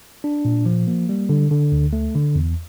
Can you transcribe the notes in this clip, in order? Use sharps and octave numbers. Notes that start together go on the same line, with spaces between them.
D4
A#2
F3
A#3
G3
D3
D3
D2
A3
D3
E2